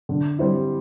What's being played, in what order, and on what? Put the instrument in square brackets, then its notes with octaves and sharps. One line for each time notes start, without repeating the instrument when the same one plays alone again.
[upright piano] D3
G3 C4 E4